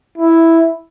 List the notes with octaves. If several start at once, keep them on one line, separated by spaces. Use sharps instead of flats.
E4